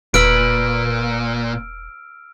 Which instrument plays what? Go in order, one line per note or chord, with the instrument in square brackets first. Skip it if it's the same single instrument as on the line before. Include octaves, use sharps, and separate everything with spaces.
[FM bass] E1 [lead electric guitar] A#2 [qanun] B4 B5 [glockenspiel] E6 F6 D7